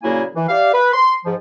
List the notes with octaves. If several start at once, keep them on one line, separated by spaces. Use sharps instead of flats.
A#2 C#3 F#3 A#3 E4 G#5
E3
G4 D5 E5 F5
B4
C6
G#2 F3